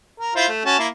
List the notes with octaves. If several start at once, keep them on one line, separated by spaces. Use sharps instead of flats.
A#4
E4 F4 C5
A3
C#4 F#4 A5
A#3 E4